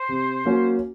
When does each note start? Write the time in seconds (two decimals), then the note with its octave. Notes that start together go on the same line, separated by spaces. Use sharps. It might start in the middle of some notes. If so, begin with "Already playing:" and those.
Already playing: C5
0.09 C3
0.45 F#3 A#3 C#4 F#4